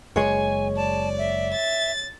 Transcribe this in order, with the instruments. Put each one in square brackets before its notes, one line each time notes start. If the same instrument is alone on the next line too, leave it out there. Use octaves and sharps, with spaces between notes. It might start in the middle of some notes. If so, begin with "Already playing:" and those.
[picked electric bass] F#1 G#3 [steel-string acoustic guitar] C#5 [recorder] G#5
[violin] D5 [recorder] A5
[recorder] E5
[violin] A6